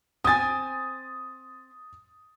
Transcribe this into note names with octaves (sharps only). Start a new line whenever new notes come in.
C4 G#5 D#6 A6